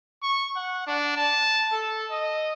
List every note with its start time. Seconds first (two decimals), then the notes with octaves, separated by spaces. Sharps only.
0.23 C#6
0.56 F#5
0.87 D4
1.17 A5
1.72 A4
2.11 D#5